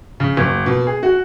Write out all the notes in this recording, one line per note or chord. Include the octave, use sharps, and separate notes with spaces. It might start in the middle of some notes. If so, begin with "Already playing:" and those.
C#3
F#1
B2
G#4
F#4